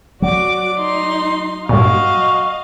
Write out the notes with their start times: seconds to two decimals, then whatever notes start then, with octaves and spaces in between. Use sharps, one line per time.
0.22 F#3 F#4 D5 D6
0.77 D#4 C6
1.69 G2 A#2 F#4 D#5 F5